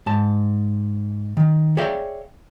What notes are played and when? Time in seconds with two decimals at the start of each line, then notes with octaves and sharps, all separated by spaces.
0.06 G#2 A5
1.37 D#3
1.77 G#4 C#5 D5 E5 F5 G5